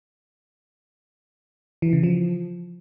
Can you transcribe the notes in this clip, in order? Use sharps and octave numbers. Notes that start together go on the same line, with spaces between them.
E3
C#3
F3